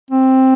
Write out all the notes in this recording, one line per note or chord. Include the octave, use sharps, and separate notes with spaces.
C4